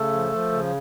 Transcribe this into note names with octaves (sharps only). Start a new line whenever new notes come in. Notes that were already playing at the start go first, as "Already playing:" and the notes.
Already playing: C#3 A3 A4
F3
F3
C#3